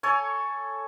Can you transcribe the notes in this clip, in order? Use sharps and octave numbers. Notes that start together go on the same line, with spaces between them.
A4 C#5 G#5